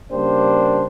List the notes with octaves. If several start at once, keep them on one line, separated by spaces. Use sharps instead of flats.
C#3 G3 A#3 D4 G4 C5